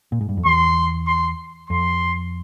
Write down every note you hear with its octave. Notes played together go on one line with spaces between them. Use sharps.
A#2
G#2
G2
F2
E2 C6
C6
F2 C6